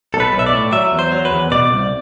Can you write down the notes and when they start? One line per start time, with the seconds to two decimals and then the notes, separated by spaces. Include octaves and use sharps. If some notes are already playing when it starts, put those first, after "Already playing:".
0.14 B1 A4
0.20 B4
0.33 B1
0.39 E5
0.46 D5
0.53 A2
0.72 F#3 E5
0.92 E2
0.99 C5
1.12 F#3
1.25 B4
1.31 E2
1.51 B2 D5
1.71 C2